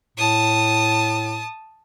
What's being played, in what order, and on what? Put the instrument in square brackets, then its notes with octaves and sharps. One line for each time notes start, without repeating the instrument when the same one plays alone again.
[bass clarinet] A2 [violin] A5 D#6